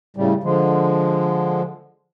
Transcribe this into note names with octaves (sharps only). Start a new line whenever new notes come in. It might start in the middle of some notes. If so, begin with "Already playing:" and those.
A2 C#3 G3
D3 F3 G#3